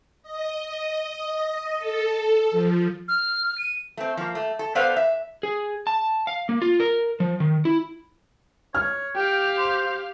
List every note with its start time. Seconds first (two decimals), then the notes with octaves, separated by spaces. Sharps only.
0.22 D#5
1.78 A4
2.51 F3
3.08 F6
3.58 D#7
3.97 A3 C4
4.17 F3 A#3
4.35 A3
4.59 A4
4.75 B3 A4 B4 C5 D5 F5
4.96 E5
5.43 G#4
5.87 A5
6.27 F5
6.49 A#3
6.62 F4
6.80 A#4
7.20 F3
7.40 D#3
7.65 E4
8.75 C#5 F6
9.16 G4 F5 G5
9.58 C5